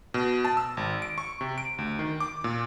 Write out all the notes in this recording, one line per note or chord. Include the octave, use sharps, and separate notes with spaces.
B2
A5
E6
G#1
D7
C#6
C3
D7
D2
D#3
D6
A#2